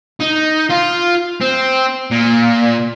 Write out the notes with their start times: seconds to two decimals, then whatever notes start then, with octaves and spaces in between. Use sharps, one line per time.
0.20 D#4
0.70 F4
1.41 C4
2.11 A#2